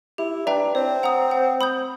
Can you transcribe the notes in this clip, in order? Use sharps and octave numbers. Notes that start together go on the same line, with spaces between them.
E4 G4
D4 B4 E5 G5 A#5
C4 C#5
F#5 A#5 D#6
F#5
B5 D#6 G6